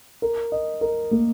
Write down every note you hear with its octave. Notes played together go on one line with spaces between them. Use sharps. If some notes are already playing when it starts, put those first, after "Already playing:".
A#4
D#5
A#4
A#3